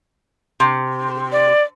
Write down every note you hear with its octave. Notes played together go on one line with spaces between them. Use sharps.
C3
D5